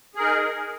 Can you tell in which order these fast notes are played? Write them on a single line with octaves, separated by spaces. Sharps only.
G#4 A#4 D#4